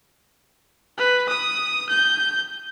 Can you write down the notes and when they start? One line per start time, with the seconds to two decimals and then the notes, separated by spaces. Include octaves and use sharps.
0.98 B4
1.29 D#6
1.89 G6